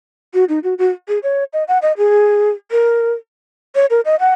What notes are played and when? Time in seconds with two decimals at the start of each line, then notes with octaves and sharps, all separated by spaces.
0.34 F#4
0.49 D#4
0.64 F#4
0.78 F#4
1.08 G#4
1.23 C#5
1.53 D#5
1.68 F#5
1.82 D#5
1.97 G#4
2.71 A#4
3.75 C#5
3.90 A#4
4.05 D#5
4.20 F#5